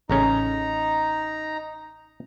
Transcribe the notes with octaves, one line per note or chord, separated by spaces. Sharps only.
A1 C#3 C#4 D#4 A#5